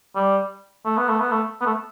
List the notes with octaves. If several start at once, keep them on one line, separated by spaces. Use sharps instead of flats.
G3
A3
B3
A3
B3
A3
B3
A3